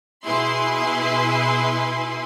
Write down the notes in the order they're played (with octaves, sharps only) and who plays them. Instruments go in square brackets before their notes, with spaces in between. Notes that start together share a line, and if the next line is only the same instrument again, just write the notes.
[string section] B2 E4 G#4 B4 C6